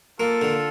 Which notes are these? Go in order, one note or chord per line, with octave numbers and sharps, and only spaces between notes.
A#3 F4 A4
D3